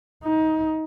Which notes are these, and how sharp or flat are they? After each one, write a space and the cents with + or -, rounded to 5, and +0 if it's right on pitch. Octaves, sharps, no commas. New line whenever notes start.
D#4 +20